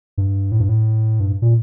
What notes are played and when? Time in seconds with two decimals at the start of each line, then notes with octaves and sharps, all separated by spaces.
0.18 G2
0.52 A2
0.60 G2
0.69 A2
1.20 G2
1.42 A#2